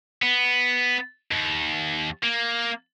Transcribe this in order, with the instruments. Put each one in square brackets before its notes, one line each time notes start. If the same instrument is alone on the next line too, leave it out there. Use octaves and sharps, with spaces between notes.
[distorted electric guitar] B3
D#2
A#3